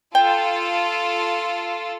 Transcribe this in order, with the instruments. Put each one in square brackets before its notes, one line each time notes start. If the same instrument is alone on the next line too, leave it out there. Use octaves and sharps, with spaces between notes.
[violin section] F4 A4 [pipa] G5